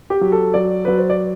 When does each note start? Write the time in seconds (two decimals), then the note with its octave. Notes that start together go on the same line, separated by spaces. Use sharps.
0.10 G4
0.21 F#3
0.32 A4
0.54 F#3 D5
0.85 F#3 B4
0.98 C5
1.10 D5